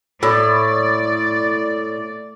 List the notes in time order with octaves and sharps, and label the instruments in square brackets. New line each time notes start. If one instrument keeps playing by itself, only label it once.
[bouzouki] A2 [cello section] D5